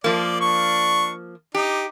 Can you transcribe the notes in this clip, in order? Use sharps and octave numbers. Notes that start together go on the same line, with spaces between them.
F3 A#3 D5
D4 C#6
D#4 G4